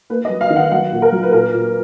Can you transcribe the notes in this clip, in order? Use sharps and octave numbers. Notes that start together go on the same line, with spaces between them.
A#3 B4
D#5
F#3
F5
D#3
F#5
F#3 F#5
A#2
A#4
F#3
B4
A#2 A#4
A#2